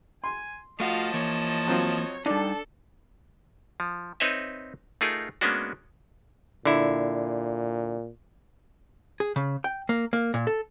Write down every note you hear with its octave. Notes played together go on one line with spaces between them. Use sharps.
G#5 C6
F3 A3 F4 F#4 D#5 F5 A5
E3 A#3 C#5
F#3 C4 F4
G3 D4 D#4 A4
F3
C4 D#4 B4 C#5 D#5 E5
A3 D#4 F4 G#4 A#4
G#3 A#3 B3 C#4 D4 F#4
A#2 D3 E4
G#4
C#3
G5
A#3
A#3
A#2
A4